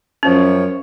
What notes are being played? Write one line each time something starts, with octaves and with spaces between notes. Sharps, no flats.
F#2 F3 C#4 C#5